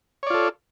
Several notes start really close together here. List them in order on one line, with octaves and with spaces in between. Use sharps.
C#5 D5 F4 A4